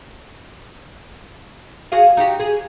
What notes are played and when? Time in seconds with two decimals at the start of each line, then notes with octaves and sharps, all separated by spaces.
1.92 F#4 G#4 F5
2.17 D#4 F#4 G4
2.40 G#4